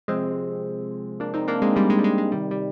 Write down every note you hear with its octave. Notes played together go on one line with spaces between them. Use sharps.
C3 F3 G#3 C4
A#3 D4
C4 D#4
A#3 D4
G#3 C4
G3 A#3
G#3
G3
G#3
G#3
C3 D#3 G3
G3